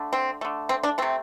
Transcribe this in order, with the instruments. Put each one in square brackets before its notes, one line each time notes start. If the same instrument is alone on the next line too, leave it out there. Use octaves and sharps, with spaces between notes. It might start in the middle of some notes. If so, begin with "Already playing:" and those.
Already playing: [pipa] D3 A3
C4
D3 A3
C4
D4
C3 A3 C4